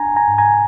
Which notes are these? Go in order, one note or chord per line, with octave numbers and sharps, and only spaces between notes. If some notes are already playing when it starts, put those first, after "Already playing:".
Already playing: D4 G#5 A#5
G#5 A#5
G#2
G#5 A#5